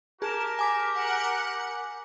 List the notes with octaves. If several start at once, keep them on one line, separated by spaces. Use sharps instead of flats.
G4 G#4 A#4 A5
G#5 D6 B6
F#5